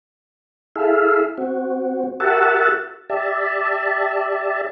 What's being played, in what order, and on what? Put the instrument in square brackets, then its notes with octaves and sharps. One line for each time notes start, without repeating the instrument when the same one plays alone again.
[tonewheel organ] E4 G#4 A4 E5 F5
C4 F#4
F#4 G4 A#4 E5 F#5 A5
G4 D5 E5 A5